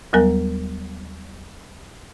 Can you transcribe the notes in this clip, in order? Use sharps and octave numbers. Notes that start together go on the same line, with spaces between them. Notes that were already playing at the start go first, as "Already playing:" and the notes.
D#2 F#3 G3 B3 A#4 G#5